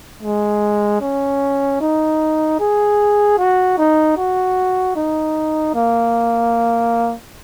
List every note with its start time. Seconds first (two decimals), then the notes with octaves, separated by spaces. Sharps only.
0.23 G#3
1.01 C#4
1.81 D#4
2.60 G#4
3.38 F#4
3.78 D#4
4.17 F#4
4.96 D#4
5.74 A#3